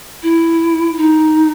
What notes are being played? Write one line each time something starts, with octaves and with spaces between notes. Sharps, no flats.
E4
D#4